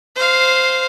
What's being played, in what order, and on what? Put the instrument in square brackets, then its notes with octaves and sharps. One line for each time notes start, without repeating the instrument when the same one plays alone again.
[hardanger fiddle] C5 F5